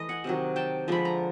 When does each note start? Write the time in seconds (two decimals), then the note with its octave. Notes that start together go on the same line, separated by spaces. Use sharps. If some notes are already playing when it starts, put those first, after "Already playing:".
Already playing: E3 A3 D#5
0.09 F#5 G#5
0.24 C3 D#3 F#3
0.56 G5 A5
0.88 D3 F3 G#3 B5
1.05 A#5